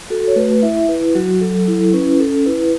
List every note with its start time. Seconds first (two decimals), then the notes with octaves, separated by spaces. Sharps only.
0.10 F#4 A4
0.28 C#5
0.36 A3 B4
0.63 E4 E5
0.89 E4 B4
1.15 F#3 F#4
1.41 F#3 A4
1.67 E4 A4
1.94 C#4 B4
2.20 C#4 A4
2.46 E4 B4